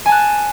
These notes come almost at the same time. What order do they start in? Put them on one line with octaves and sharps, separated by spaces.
G#5 A5 F#6